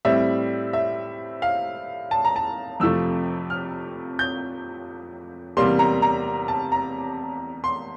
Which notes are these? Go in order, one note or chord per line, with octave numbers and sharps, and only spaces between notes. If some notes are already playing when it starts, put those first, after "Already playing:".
A2 G3 C4 E5
E5
F5
A5
A#5
A5
F2 C3 F3 A3 E6
F6
G6
E2 C3 G3 A#3 C6
A#5
A#5
A5
A#5
C6